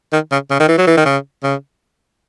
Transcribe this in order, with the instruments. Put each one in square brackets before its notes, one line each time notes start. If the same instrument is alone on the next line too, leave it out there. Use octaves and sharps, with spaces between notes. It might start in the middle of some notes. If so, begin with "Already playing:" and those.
[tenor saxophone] D#3
C#3
C#3
D#3
E3
F#3
E3
D#3
C#3
C#3